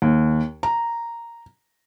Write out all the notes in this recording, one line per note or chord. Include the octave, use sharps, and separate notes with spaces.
D#2
A#5